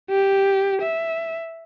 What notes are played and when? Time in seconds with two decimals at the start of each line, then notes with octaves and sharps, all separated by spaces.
0.10 G4
0.82 E5